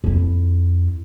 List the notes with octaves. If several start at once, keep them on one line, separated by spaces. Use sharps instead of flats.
F2 E4